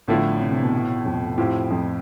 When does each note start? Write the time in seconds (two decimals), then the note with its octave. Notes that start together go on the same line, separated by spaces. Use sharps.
0.07 A1 A2 D3 F3 A3 E4
0.41 C3
0.52 C3
0.62 B2
1.05 F2
1.38 A2 F3 C4 E4 G4
1.71 F2